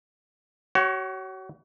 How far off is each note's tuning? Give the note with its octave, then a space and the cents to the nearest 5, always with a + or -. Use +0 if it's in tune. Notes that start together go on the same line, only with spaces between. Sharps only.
F#4 +35 C#5 +0